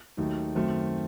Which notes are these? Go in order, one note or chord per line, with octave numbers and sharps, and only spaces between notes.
D#2 D#3 F#3 A3 D#4
F#2 D#3 A3 C4